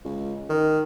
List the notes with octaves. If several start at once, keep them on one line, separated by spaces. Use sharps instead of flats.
C#2
D#3